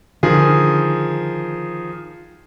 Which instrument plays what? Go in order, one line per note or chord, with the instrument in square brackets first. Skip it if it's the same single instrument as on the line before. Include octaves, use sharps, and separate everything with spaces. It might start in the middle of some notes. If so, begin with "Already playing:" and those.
[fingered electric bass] D3 D4 [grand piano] D#3 F3 G#4